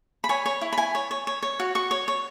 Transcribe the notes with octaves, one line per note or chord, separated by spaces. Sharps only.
B5
C#5 G#5
C#5
E4
B5
E4 G#5
C#5
C#5
C#5
C#5
F#4
F#4 C#6
C#5
C#5